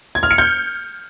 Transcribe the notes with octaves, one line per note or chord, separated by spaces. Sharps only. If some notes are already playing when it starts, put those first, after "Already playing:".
G#6
F6
C#7
G6